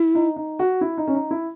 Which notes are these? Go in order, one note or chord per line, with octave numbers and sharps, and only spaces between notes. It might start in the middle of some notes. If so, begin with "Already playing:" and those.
Already playing: E4
D#4
D#4
F#4
E4
D#4
C#4
D#4
E4